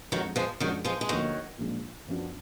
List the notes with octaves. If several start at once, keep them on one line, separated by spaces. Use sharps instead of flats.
F2 D#3 F3 F#3 G#3 D4
F3 G#3
F#2 D#3 F3 F#3 G#3 D4
F3 G#3
G#3
D2 D3 D#3 F3 F#3 A#3 D#4
A#2 F3 G#3 D4
F#2 F3 B3 D4 F#4